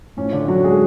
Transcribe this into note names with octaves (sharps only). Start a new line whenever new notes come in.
A2 F3 C#4
D3 D4
F#3 F#4
G#3 G#4